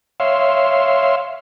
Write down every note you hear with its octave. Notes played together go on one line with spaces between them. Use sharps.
C#5 E5 F5 C6